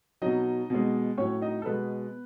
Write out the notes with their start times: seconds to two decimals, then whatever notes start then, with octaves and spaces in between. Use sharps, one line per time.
0.22 B2 F#3 D#4 D#5
0.70 B2 G#3
1.18 A2 F#3 C#4 C#5
1.42 D#4 D#5
1.62 A4
1.66 B2 G#3 B3 B4